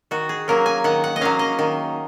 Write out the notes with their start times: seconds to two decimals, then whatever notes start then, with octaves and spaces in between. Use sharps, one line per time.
0.11 D#3 F#4
0.29 G#4
0.48 F#3 A#3 C#4 A#4
0.66 G#5
0.84 D#3 F#5
1.04 F#5
1.16 D#5
1.21 F#3 A#3 C#4 F5
1.39 D#5
1.59 D#3